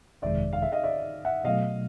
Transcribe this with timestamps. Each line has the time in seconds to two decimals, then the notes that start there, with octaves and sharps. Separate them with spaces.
0.22 G1 F2 C3 D#3 G#3 D5 E5
0.53 F5
0.62 E5
0.72 D#5 F5
0.84 D5 E5
1.25 E5 F#5
1.44 B2 F#3 A3 D#5 F5